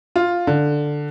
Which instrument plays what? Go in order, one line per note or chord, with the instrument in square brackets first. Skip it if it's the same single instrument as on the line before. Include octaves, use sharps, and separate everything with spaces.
[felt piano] F4
D3